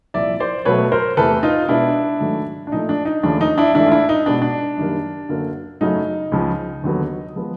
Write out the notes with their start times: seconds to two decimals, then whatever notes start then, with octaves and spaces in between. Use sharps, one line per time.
0.14 C2 A#2 F3 D5 E5
0.40 C5 D5
0.65 B2 F#3 A3 B4 C#5
0.92 A#4 C5
1.17 E2 C3 E3 A3 A4 B4
1.43 D#4 F4
1.69 B2 G#3 B3 D4 E4
2.20 G#2 D#3 F#3 A3
2.67 D4
2.72 A#2 F3 A3 D#4
2.89 D4
3.05 D#4
3.23 D#2 C#3 F3 A3 D4
3.41 D#4
3.58 D4 E4
3.74 G#2 E3 A3 D4 E4
3.87 F4
3.92 D4 E4
4.09 D#4
4.26 B2 G#3 B3 D4
4.42 D4
4.77 F#2 D#3 G3 A#3
5.29 F#2 D3 F#3 A#3
5.81 F#2 C#3 F#3 A3 D#4
6.32 C#2 C#3 F3
6.84 D#2 D3 F#3 B3
7.36 F3 G#3 B3